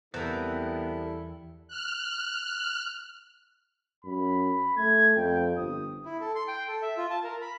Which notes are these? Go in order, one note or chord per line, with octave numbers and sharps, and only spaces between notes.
E2 G3 B3 C4 E4 A4 A#4
F6 F#6
F#2 B5
A3 G#6
F2 G5
G1 D#6
E4
A4
C6
G5
A4
E5
F4
A5
A#4
B5